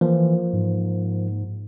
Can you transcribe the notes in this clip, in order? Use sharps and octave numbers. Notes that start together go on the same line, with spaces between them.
E3 F3 A#3
G#2